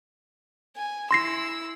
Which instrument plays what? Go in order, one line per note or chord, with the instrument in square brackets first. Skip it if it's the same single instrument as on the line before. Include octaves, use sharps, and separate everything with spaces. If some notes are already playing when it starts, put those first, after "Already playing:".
[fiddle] G#5
[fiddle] E4 E6 [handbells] C6 A#6 C7